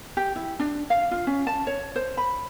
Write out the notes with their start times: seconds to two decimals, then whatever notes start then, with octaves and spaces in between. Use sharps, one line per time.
0.17 G4
0.36 E4
0.60 D4
0.90 F5
1.11 F4
1.27 C#4
1.47 A5
1.67 C#5
1.96 C5
2.17 B5